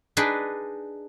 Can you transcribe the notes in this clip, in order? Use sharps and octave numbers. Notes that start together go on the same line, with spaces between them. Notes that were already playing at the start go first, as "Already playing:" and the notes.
D4 D#4 G#4 B4 D5